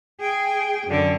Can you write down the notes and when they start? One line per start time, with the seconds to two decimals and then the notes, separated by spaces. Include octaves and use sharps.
0.20 G#4 G5
0.87 F#2 D3